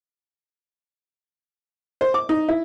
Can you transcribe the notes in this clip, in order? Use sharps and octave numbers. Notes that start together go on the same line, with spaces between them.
C5
D6
D#4
E4